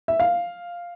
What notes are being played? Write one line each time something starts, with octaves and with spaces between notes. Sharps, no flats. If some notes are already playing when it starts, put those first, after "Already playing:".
E5
F5